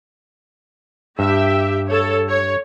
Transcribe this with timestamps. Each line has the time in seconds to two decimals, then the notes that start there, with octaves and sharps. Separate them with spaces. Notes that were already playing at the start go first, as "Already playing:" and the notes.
1.19 G2 G4 E5
1.88 A4 C#5
2.29 C#5